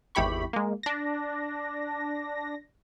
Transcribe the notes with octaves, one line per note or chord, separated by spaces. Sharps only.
G#1 E2 E4 G4 B5 C#6
G#3 A#3
D4 A#6